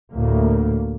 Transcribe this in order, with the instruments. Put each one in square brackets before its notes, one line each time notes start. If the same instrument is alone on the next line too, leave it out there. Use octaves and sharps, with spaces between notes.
[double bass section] D2 A2 A#3